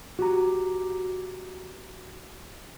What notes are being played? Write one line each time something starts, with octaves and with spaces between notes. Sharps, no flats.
F#4 G4 A#5